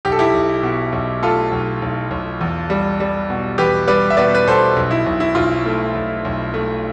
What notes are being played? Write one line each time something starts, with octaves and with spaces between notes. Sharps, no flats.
B1 G4
A4
E4 G4
B1
B2
B1
A3 F4 A4
B1
B1
B1
E2
G3
G3
B2
E2 G4 B4
G3 B4 D5
E5
B2 B4 D5
B4
B2 A4 C5
B1
E4
B1
E4
B1 F4
A3
B1
B1
A3